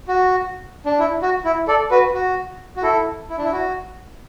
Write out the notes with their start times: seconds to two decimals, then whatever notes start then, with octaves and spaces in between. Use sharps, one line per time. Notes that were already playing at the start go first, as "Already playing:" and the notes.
0.08 F#4
0.86 D4
0.99 E4
1.22 F#4
1.45 E4
1.68 A4 D5
1.91 F#4 B4
2.14 F#4
2.77 F#4
2.82 E4 A4
3.29 E4
3.38 D4
3.45 E4
3.52 F#4